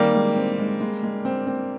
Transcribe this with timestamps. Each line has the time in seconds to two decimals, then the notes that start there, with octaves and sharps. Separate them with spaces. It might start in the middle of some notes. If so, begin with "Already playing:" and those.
Already playing: D#3 G3 A#3 C4
0.14 G#3
0.37 C4
0.58 G#3
0.81 G#3
1.03 G#3
1.25 C4
1.47 C4